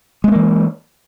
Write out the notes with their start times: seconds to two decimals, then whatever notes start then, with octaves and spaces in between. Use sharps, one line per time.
0.24 G#3
0.28 B3
0.32 A#3
0.36 E3